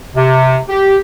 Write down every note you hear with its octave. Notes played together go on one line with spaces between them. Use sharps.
C3
G4